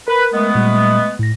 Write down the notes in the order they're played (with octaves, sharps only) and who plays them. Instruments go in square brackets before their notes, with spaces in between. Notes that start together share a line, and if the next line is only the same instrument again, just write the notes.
[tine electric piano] A#4 [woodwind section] B4
[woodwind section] G#3 A3 B3
[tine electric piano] A#2 G3
A2 A#6